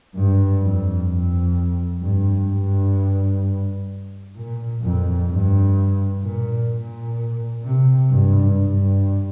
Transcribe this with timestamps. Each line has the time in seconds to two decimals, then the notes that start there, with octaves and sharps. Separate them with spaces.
0.15 G2
0.62 F2
1.09 F2
2.02 G2
2.49 G2
4.36 A#2
4.82 F2
5.30 G2
6.23 A#2
6.69 A#2
7.63 C3
8.10 G2
8.56 G2